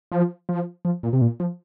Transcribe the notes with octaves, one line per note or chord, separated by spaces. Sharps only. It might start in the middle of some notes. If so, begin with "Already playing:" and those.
F3
F3
F3
A#2
C3
A#2
F3